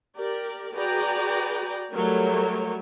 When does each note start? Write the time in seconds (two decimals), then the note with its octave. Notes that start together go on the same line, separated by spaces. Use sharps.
0.16 G4 A#4 D5
0.74 F#4 G#4 B4 D5 G5 A#5
1.92 F#3 G3 A3 A#4 C#5